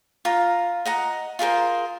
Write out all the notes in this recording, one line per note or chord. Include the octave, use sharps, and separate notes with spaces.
F4 A#5
D#5 F#5 A#5
F4 G#4 A#4 C5